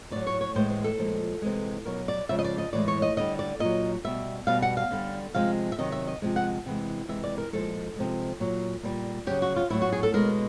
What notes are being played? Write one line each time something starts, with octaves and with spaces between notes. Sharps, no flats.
A2 F#3 D5
C#5
C#5
A2 E3 G#3 C5
C5
A4
A#2 F3 G#3
C3 E3 G#3
B2 F#3 A#4
D5
C#3 F3 G#3 E5
D#5
D5
D#5
A2 E3 G#3 D5
C#5
D#5
D3 G3 D#5
D5
A#2 F#3 D#5
B2 G3 E5
B2 G3 F5
F#5
F5
D3 G3
C3 F3 G#3 F5
E5
C3 D#3 F#3 D#5
E5
D#5
C3 F3 G#3
F#5
C3 E3 G#3
C3 E3 G#3 E5
D5
A#4
A#2 F3 G#3 A4
C3 F3 G#3
A#2 F#3
A#2 G3
C#3 F#3 G4
F#4
F4
A2 F#3 E4
F#4
G#4
A4
B2 G#3 A#4